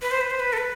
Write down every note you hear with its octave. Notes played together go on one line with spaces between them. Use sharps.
B4
C5
B4
C5
B4
A4
B4